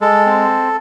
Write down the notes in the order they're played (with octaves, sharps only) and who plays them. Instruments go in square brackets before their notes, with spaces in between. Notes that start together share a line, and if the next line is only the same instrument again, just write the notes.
[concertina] G#3 A4
C4